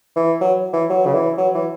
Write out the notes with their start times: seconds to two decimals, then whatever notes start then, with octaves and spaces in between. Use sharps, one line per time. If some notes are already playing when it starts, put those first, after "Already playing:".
0.16 E3
0.41 F#3
0.73 E3
0.90 F#3
1.06 C#3
1.14 E3
1.38 F#3
1.54 E3